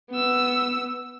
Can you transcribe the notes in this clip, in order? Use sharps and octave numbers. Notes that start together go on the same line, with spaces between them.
B3 E6